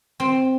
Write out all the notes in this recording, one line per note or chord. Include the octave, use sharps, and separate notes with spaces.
C4